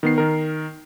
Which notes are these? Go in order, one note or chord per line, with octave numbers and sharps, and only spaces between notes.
D#3 B3 C7
D#3 A#4